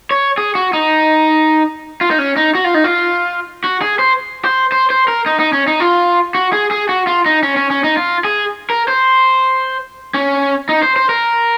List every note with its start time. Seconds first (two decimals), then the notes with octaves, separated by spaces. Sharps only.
0.11 C#5
0.38 G#4
0.55 F#4
0.73 D#4
2.01 F4
2.11 D#4
2.19 C#4
2.37 D#4
2.55 F#4
2.64 F4
2.74 D#4
2.84 F4
3.64 F#4
3.82 G#4
3.99 C5
4.45 C5
4.72 C5
4.90 C5
5.08 A#4
5.26 D#4
5.40 D#4
5.53 C#4
5.67 D#4
5.80 F4
6.35 F#4
6.53 G#4
6.71 G#4
6.89 F#4
7.07 F4
7.26 D#4
7.43 C#4
7.57 C#4
7.70 C#4
7.84 D#4
7.97 F4
8.24 G#4
8.70 A#4
8.88 C5
10.14 C#4
10.69 D#4
10.83 C5
10.96 C5
11.09 A#4